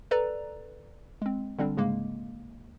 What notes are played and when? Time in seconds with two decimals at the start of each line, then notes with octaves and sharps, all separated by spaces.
0.11 A4 B4 D5 A#5
1.22 G#3 C4
1.58 D3 G3 C4 D4
1.77 G#2 C#3 G#3 A#3